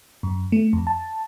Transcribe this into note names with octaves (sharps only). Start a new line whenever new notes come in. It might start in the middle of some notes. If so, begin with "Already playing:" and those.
F#2
A3
F2
A5